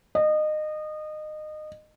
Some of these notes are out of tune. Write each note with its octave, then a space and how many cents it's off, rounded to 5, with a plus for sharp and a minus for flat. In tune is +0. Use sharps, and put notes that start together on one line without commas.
D#5 -25